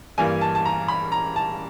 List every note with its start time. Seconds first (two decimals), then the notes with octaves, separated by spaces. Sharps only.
0.18 G2 E3 G3 A#3 G#5
0.41 A5
0.55 A5
0.65 A#5
0.88 B5
1.12 A#5
1.36 A5